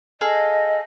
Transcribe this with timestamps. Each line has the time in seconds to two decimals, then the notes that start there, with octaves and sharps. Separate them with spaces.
0.21 G#4 A4 D#5 F5